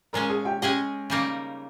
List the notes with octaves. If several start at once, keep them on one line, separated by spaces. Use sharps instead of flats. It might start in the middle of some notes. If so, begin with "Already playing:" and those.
A#2 G#3 C#4 A#4 A#5
G#4 G#5
G4 G5
G#3 C#4 G4 G#4 D#5 G5
C#3 G3 A#3 D#4 A#4